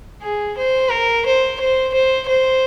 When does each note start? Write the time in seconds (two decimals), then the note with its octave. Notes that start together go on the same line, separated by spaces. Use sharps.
0.23 G#4
0.58 C5
0.91 A#4
1.26 C5
1.60 C5
1.94 C5
2.29 C5